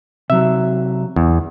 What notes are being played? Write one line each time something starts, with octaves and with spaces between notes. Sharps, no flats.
C3 F#3 E5
E2